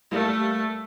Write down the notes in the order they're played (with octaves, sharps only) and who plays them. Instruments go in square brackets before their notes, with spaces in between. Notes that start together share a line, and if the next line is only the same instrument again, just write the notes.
[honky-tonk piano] G3 A#3 [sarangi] A3